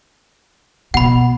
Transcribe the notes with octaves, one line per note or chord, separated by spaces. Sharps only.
B2 F#5 B5